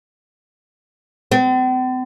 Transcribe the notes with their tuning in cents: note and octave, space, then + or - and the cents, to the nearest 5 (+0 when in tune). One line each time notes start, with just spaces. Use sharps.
C4 -45